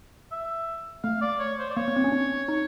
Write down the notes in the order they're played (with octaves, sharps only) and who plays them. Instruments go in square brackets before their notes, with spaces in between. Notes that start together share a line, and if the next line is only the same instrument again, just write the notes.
[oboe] E5
[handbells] A3 [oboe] F5
[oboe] D5
C#5
C5
D5
[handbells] A#3 [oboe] C#5
[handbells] B3
C4
C#4
D4
D#4